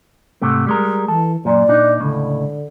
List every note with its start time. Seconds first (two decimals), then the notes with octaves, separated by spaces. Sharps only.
0.42 G#2 C3 A3
0.67 G3 G#3 A#4
1.08 E3 A4
1.45 F#2 A#2 D5
1.68 A#2 D4 D#4
2.00 C#2 A2 D3